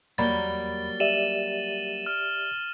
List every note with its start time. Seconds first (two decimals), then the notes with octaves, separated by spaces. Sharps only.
0.18 E2 F#3 G3 A#3 B5 A6 G7
1.00 G4 D5 E5 D#7 E7 F#7
2.06 F6